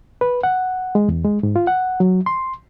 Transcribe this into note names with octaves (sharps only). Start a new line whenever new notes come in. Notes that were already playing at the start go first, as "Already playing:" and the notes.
B4
F#5
G#3
E2
G#3
G#2
F4
F#5
F#3
C6